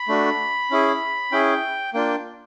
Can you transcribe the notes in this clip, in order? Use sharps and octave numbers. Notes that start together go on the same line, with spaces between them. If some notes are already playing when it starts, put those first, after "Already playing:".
Already playing: B5
A3 D4 F#4
C#4 E4 G#4
C#4 E4 G#4 G5
A#3 D4 F4 G5